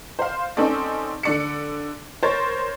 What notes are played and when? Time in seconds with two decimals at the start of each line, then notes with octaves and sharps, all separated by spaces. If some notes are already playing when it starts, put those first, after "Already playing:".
0.19 C5 F5
0.57 C4 C#4 D#4 A4 D5
1.23 D3 D5 C#7
2.23 A#4 C5 C#5 A6